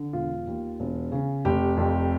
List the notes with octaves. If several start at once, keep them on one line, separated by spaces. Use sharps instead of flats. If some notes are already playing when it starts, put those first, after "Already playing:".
Already playing: D3
E1 F4
D#2
E1
C#3
F1 G4
F2